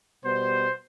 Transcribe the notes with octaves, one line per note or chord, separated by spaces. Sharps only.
B2 G3 B3 C5